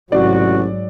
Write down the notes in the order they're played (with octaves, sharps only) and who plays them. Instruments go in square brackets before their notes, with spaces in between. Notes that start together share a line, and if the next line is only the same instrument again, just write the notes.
[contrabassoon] A1 [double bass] G#2 F#3 [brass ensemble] C3 F#4 [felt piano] D5